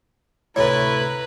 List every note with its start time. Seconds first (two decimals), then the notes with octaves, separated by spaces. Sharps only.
0.56 D2 A2 C3 E4 B4 C#5 A#5